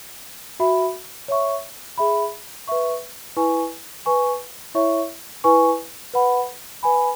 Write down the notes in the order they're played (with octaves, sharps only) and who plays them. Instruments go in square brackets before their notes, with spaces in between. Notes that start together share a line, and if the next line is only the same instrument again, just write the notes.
[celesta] F#4 E5 B5
C#5 E5 C#6
G#4 E5 B5
B4 E5 C#6
E4 B4 G#5 C#6
B4 G#5 C#6
E4 C#5 E5 C#6
E4 B4 G#5 C#6
B4 F#5 B5
B4 G#5 B5